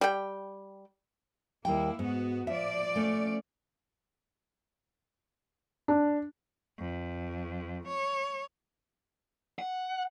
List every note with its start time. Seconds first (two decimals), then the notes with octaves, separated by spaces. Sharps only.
0.01 G3 G5
1.65 D#2 G3 A#3 E4 G5
1.99 G#2 B3 F#4
2.47 F3 D5 E5
2.96 A3 C#4
5.88 D4
6.79 F2
7.88 C#5
9.59 F#5